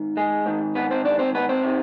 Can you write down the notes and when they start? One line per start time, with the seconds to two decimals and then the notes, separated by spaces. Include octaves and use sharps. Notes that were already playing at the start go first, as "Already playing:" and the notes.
Already playing: G#2 D#3
0.17 G#3 G#4
0.46 G#2 D#3
0.75 B3 B4
0.91 C4 C5
1.05 D4 D5
1.19 C4 C5
1.35 B3 B4
1.49 C4 C5
1.64 C3 D#3